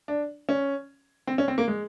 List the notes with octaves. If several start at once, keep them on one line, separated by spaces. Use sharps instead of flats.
D4
C#4
C4
C#4
C4
A#3
G#3